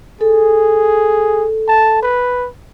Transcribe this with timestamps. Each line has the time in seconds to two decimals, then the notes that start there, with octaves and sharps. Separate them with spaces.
0.21 G#4 A4
1.68 A5
2.02 B4